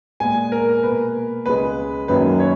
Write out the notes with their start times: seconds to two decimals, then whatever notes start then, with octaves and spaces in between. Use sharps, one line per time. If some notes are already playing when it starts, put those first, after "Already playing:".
0.20 A#2 G#3 B3 G#5
0.52 A#4
0.83 B2 A#3 B4
1.46 C#2 C#3 G#3 B4
2.08 F#2 D#3 F#3 A#3 B4
2.40 C#5